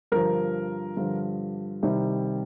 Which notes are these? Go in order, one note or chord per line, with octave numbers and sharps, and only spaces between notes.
G2 D3 F3 A#4
G2 D3 F3
C2 C3 D#3 G3